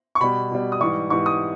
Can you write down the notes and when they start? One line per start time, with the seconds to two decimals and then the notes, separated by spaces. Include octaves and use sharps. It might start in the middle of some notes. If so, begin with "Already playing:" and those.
0.15 C#6
0.21 B2 G3 B5
0.51 B2 G3
0.72 D#6
0.81 G#2 E3 G3 C#6
1.10 G#2 E3 G3 C#6
1.26 D#6